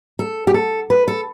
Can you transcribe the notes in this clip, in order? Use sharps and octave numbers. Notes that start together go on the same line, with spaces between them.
A4
G4
A4
B4
A4